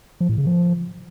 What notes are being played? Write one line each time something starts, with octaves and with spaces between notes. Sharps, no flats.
F3
A2
C#3
F3